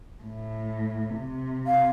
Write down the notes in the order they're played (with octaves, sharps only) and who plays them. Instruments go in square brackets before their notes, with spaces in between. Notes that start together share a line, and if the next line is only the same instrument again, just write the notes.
[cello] A2
C3
[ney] F5